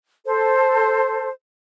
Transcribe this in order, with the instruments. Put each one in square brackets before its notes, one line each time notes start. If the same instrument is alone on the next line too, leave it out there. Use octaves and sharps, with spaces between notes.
[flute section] A4 C5